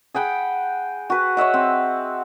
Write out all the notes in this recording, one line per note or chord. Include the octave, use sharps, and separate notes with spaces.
G#4 F#5 G5 B5
F#4 B4
C#5 D#5 E5 F#5
C4